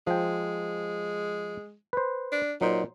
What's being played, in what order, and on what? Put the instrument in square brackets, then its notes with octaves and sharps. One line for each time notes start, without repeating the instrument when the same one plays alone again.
[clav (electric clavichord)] F3 G5 [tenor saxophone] G#3
[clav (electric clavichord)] B4 C5
[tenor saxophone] D4
[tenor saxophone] A#2 [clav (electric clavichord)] F#3 D#4 C5